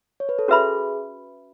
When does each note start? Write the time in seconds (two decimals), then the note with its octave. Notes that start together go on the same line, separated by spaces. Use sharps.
0.20 C#5
0.29 B4
0.39 A4
0.48 C#4 F#4 G#4 B4 E5 B5